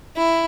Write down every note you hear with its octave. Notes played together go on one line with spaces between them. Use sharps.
E4